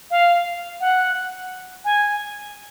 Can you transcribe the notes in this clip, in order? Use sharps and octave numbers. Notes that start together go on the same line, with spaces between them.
F5
F#5
G#5